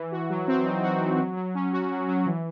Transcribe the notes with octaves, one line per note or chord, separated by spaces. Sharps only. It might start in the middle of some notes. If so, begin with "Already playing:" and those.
Already playing: E3
F#4
F#3
C4
D#4
F#4
F#3
F#3
F#3
C#4
F#4
F#3
F#3
E3